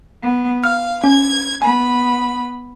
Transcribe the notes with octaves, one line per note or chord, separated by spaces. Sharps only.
B3
F5 F6
C#4 G#6
B3 G#5 B5